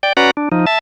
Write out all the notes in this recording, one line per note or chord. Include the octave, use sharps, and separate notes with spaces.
D5 G5
C#4 F#4 B4 D5 F#5 A#5
D4
F3 D#4
E5 A5